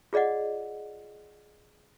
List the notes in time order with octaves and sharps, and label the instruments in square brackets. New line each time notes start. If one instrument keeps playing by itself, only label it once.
[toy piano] F4 G#4 D5 D#5 F#5